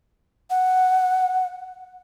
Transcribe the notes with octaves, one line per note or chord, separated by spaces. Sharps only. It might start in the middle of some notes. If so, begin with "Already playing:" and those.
F#5